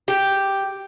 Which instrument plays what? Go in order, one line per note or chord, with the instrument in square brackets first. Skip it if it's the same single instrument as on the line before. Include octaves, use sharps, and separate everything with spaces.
[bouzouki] G4